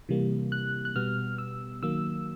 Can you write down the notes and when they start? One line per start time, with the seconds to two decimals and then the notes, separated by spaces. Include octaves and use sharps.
0.09 C3 E3 G3 A#3
0.52 F#6
0.85 F#6
0.96 B2 G3 B3 F6
1.38 E6
1.82 D#3 F#3 A#3 E6